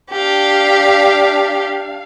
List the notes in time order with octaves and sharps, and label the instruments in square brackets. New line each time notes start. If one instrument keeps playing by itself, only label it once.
[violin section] D4 F5 [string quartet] G4